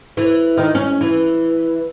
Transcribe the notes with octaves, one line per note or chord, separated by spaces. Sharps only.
E3
D#3
C#4
E3